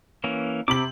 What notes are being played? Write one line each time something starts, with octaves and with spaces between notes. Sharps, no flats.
E3 A#3 C#4
C3 C4 B5 D6 F#7